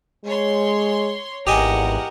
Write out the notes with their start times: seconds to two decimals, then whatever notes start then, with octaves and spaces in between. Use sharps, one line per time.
0.25 G#3 C#5 C6
1.47 G#1 E2 G4 A#4 D#5 F#5 G#5